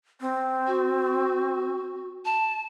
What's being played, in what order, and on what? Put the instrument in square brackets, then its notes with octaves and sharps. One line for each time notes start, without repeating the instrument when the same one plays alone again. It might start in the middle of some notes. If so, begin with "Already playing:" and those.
[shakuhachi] C4
[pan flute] F#4
A5